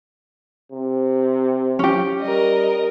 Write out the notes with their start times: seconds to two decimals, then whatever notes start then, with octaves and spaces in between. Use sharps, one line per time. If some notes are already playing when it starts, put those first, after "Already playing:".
0.72 C3
1.79 C#4 G4
2.21 G3 A#4 D#5